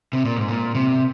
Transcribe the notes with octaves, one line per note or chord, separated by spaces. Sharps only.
C3
A#2
G#2
A#2
C3